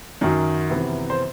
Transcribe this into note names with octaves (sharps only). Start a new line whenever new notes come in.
F#2 D#3 F#3
C3 E3 B3
C5